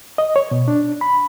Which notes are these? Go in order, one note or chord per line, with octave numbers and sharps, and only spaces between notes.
D#5
C#5
B2
D4
B5